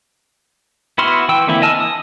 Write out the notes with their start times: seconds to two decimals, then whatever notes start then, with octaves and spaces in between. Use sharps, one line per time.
0.98 B3 E4 F#4 C6 F6
1.29 E3 G5 E6
1.47 D3 E3 A#3 C4 E4
1.62 D#5 G#5 A5 E6 F6
1.80 D#6